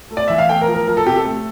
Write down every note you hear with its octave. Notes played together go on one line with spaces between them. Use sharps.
A3
D5
E3 E5
F5
A3 G5
A#4
F3
A#4
F3 A#4
A4
C3 G4
A4
A3